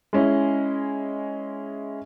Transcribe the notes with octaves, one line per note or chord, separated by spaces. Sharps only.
G#3 C#4 E4